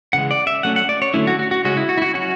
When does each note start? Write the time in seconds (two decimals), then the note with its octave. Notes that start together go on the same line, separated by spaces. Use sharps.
0.13 C#3 E3 G#3 F#5
0.31 D5
0.47 E5
0.63 F#3 A3 C#4 F#5
0.76 F#5
0.89 D5
1.02 C#5
1.14 D3 F#3 A3 C#4 E4
1.27 F#4
1.39 F#4
1.51 F#4
1.64 C#3 G#3 C#4 F#4
1.77 E4
1.89 F#4
1.98 E4
2.02 F#4
2.14 F#3 C#4 F#4